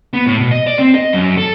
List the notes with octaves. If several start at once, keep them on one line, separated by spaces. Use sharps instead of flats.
B3
A2
B2
D#5
D5
C4
D#5
F#2
A4